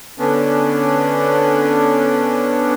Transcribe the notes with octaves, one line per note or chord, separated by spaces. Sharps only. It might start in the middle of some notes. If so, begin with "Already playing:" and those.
D3 B3 C#4 D4